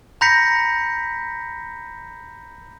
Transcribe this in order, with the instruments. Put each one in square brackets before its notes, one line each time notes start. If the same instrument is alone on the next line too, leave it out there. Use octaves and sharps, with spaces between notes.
[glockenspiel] A#5 B5 G6 A#6 B6 C#7